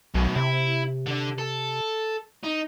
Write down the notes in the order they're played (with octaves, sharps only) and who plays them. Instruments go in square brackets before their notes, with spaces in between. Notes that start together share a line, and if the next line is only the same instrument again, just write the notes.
[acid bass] B1 [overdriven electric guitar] F#2 B2
[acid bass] C3 [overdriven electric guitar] E4
[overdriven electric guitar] D3 D4
A4
D#4